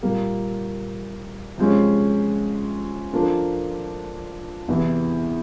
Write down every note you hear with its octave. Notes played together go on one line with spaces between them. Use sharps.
A#2 G3 A#3
C3 F3 G#3 C#4
F3 A#3 D4 F4 A4
E2 C3 E3